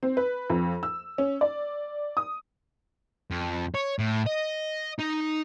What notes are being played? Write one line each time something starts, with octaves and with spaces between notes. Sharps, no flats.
C4
B4
F2
E6
C#4
D5
D#6
F2
C#5
A2
D#5
D#4